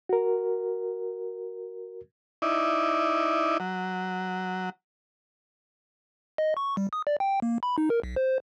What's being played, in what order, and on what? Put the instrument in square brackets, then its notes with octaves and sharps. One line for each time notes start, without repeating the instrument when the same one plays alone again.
[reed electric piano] F#4 A#4
[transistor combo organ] D#4 E4 D5
F#3
[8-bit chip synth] D#5
C#6
G3
D#6
D5
G5
A#3
B5
D#4
A#4
B1
C5